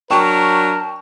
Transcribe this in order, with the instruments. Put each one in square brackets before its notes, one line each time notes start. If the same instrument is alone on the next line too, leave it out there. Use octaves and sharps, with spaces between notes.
[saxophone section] F#3 D4 [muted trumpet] A#4 [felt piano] G5 C#6 [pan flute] A5